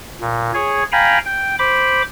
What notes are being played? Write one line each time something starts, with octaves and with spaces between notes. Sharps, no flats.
A#2
G#4 C#5
F5 G5 G#5 A#5 B5
G5
C5 B5 D6